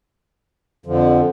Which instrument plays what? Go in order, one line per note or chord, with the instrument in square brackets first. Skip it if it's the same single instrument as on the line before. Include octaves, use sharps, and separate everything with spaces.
[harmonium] F2 D3 F3